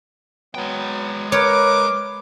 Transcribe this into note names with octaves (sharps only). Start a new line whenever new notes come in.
F#3 G#3 B3 G5
A#4 B4 C#5 D6